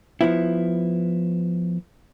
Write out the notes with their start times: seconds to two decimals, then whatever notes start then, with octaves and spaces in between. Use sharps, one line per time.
0.21 F3 B3 E4